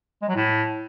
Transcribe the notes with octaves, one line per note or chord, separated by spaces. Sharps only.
G#3
F#3
A2